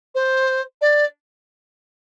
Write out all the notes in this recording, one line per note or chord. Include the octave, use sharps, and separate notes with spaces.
C5
D5